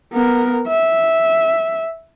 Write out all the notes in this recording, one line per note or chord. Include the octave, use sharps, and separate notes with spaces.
B3 A#4
E5